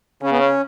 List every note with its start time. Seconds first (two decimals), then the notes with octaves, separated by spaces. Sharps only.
0.23 C#3 C#4
0.31 B3
0.39 C#4